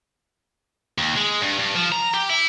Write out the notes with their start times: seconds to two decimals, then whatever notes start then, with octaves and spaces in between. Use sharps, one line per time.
0.98 D#2
1.16 G#3
1.42 G2
1.59 G2
1.75 F3
1.92 A#5
2.14 G4
2.30 E4